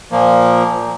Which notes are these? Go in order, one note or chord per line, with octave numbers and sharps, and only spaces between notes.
A#2 F3 A#3